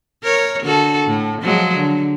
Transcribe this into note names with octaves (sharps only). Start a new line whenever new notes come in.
A#4 C#5
D3 F#4 A4
A2
F3 F#3 G#3
D3